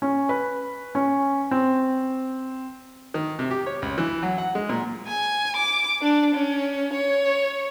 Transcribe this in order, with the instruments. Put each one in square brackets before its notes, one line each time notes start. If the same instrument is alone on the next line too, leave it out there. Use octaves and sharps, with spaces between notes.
[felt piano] C#4
B4
C#4
C4
[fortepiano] D#3
C3
G4
C#5
C#2
E3
F#3
F#5
G#3
A#2
[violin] G#5
D6
D4
C#4
C#5